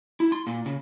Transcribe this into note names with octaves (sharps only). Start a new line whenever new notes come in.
E4
C6
A#2
C#3